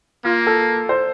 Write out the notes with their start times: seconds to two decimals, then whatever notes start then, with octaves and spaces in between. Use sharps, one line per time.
0.25 A#3 F4
0.47 A4
0.89 C5